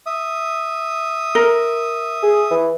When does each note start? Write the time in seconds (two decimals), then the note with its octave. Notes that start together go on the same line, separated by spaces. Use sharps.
0.06 E5 D#6
1.35 A#4
2.23 G#4
2.51 E3